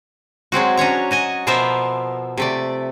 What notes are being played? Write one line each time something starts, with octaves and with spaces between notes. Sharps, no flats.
F#3 G#3 C4 F#4
C#4 D4 C#5 A#5
F#4 D#5 G#5
B2 F3 B3 A#4 C5 E5
C3 A3 D5